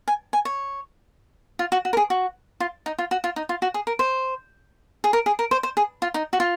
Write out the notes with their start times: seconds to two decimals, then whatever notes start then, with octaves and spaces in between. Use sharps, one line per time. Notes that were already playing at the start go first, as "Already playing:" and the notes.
0.08 G#5
0.33 G#5
0.45 C#5
1.59 F4
1.72 F#4
1.85 F#4
1.93 A#4
1.97 G#4
2.10 F#4
2.60 F4
2.86 D#4
2.98 F4
3.11 F#4
3.24 F4
3.36 D#4
3.49 F4
3.62 F#4
3.74 G#4
3.87 A#4
3.99 C5
5.04 G#4
5.13 A#4
5.26 G#4
5.39 A#4
5.51 C5
5.63 C5
5.77 G#4
6.02 F4
6.14 D#4
6.33 F#4
6.40 F4